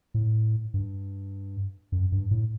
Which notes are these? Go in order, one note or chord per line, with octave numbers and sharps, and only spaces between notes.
A2
G2
F#2
G2
A2